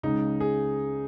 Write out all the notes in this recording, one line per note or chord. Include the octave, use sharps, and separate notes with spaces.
C#2 C#3 D#4
G#4